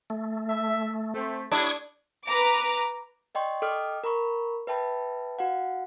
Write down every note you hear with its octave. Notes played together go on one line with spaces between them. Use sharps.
A3
E5
A3 C4
A2 D4 E4 G4 C#6 D#6 G#6
B4 A#5 D6
D5 D#5 G5 C6 C#6
A4 D#5 G5 D6 D#6 F6
A#4 A#5 B5 C#6
B4 E5 G5 A5 B5
F#4 F5 F#5